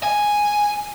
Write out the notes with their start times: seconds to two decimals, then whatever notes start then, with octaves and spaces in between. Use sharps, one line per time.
0.03 G#5